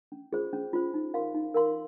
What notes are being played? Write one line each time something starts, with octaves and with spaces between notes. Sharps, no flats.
C#4
F4 G#4 C5
C#4
F4 G#4 C5
D#4
A#4 F5 C6
D#4
A#4 F5 C6